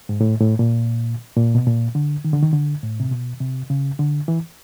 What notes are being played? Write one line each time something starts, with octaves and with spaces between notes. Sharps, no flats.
G#2
A2
A2
A#2
A#2
B2
A#2
D3
D#3
D3
D#3
D3
A2
C3
B2
C3
C#3
D3
E3